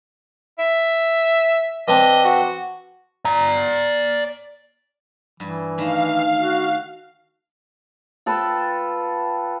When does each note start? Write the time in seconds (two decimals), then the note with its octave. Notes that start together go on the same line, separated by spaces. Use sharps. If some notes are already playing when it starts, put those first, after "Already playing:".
0.59 E5
1.88 E3 C4 D4 D#5
2.24 F#4
3.25 D5 A#5
5.40 G2 E3
5.78 D#3 A3 F5
6.38 F#4
8.26 F4 A4 B4 G5